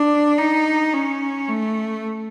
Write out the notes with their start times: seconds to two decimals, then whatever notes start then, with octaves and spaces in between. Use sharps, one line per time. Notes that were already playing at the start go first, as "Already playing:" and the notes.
Already playing: D4
0.38 D#4
0.93 C#4
1.48 A3